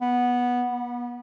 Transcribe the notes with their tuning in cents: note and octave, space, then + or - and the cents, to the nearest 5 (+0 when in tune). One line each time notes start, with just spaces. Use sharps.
B3 -10
B3 -35